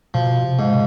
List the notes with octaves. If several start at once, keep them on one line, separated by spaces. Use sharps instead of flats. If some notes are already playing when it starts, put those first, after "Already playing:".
B2 F3
C3
G#2